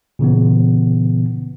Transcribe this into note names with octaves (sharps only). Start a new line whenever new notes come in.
A#2 C#3 E3 B3